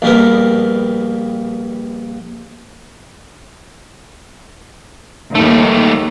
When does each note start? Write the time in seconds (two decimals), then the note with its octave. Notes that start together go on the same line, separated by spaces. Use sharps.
0.02 A#1 F2 G3 B3 A#4
5.35 D#2 G3 A3